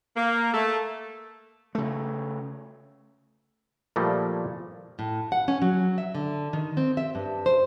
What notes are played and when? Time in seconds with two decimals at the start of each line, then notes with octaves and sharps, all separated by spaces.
0.17 A#3
0.54 A3
1.75 C#3 A3
3.96 A#2 F3 G3 A3 A#3
4.99 A2
5.32 F#5
5.48 C#4
5.62 F#3
5.98 E5
6.15 D3
6.53 D#3
6.77 C4
6.97 E5
7.15 G2
7.46 C5